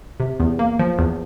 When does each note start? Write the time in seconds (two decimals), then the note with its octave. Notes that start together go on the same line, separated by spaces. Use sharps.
0.20 C3
0.40 E2
0.59 A#3
0.79 F3
0.99 E2